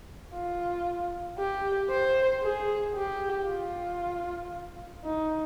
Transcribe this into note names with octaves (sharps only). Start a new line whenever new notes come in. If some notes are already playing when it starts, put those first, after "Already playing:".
F4
G4
C5
G#4
G4
F4
D#4